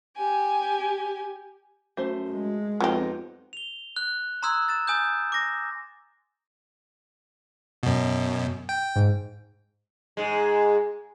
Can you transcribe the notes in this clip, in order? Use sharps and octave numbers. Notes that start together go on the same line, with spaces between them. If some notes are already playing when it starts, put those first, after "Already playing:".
G4 G#5
F#2 A3 C5
G#3
F2 F#3 B3 C4 D#4 G4
F7 G7
F#6
A#5 C6 D#6 E6 F#6 G#6
A6 E7
G#5 D#6 G6
D6 A#6
F#2 B2
G5
G#2
G#2 G#3